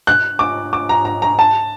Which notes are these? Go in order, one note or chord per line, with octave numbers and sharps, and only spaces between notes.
F#6
D6
D6
A#5
A#5
A#5
A5